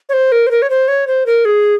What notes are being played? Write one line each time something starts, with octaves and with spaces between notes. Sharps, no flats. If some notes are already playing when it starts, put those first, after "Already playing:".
C#5
C5
A#4
C5
A#4
C#5
C5
C#5
C5
A#4
G#4